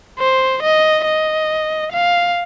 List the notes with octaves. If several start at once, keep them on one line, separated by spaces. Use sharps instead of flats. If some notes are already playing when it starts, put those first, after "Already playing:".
C5
D#5
D#5
F5